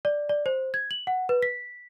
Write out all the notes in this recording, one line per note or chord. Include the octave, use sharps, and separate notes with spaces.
D5
D5
C5
G#6
F#7
F#5
B4
B6